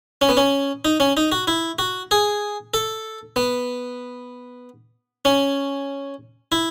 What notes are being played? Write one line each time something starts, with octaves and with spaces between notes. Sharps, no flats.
C#4
B3
C#4
D#4
C#4
D#4
F#4
E4
F#4
G#4
A4
B3
C#4
E4